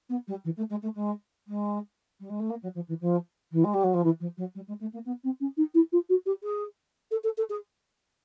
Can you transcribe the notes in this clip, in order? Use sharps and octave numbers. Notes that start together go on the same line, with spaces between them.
B3
G3
E3
A3
G#3
A3
G#3
G#3
G3
G#3
A3
A#3
F#3
F3
E3
F3
E3
G#3
G3
F#3
F3
E3
F3
F#3
G3
G#3
A3
A#3
B3
C4
C#4
D#4
E4
F4
F#4
G4
G#4
A4
A4
A4
G#4